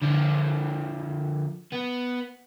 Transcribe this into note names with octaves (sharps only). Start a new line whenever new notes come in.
D3 F3
B3